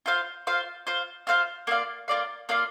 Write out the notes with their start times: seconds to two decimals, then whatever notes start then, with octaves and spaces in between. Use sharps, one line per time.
0.06 F4 C5 F5
0.47 F4 C5 F5
0.87 F4 C5 F5
1.27 F4 C5 F5
1.67 A#3 F4 D5 F5
2.08 A#3 F4 D5 F5
2.49 A#3 F4 D5 F5